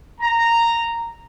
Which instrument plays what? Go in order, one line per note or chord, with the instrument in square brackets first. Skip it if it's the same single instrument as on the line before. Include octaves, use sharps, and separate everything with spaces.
[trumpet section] A#5